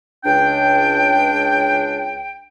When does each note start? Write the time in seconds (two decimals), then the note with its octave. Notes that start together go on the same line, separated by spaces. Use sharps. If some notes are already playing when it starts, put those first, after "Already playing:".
0.24 C#2 D4 G5